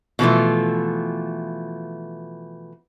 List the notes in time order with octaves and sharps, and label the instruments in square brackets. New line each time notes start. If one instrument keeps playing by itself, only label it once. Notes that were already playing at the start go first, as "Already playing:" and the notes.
[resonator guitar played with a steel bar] B2 E3 F3 A3